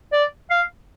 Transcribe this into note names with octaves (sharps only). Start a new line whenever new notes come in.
D5
F5